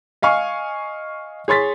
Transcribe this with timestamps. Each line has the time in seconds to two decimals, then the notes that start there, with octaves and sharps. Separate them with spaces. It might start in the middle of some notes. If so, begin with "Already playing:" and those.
0.22 D#5 F5 G#5 C#6
1.48 G#4 C#5 C6 A6 B6